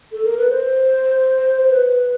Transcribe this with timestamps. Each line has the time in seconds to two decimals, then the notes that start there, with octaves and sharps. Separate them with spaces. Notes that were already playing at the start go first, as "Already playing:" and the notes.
0.12 A4
0.24 A#4
0.37 B4
0.50 C5
1.62 C5
1.70 B4